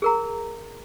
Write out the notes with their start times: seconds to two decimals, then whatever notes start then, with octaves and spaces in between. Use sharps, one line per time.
0.02 G#4 A#4 A#5